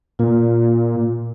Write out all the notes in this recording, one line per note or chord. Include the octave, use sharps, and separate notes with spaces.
A#2 F4